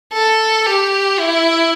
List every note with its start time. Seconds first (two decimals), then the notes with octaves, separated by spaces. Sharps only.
0.13 A4
0.66 G4
1.20 E4